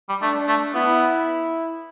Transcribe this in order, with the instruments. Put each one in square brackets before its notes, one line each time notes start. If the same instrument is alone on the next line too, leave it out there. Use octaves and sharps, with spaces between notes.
[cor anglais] G3
[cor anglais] A3 [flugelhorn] D4
[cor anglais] A3
[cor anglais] B3 [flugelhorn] E4